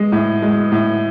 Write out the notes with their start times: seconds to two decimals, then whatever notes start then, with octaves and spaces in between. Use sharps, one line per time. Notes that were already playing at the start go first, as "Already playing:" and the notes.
Already playing: G#3
0.12 A2
0.42 G#3
0.72 A2